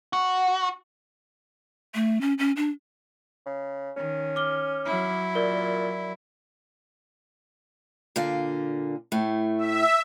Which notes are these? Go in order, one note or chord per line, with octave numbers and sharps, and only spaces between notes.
F#4
A3
C#4
C#4
D4
C#3
D#3 C#4
D6 F6 G7
F#3 E4
A#2 A#4 D5 G7
A#2 D3 F5
A2 A3
E5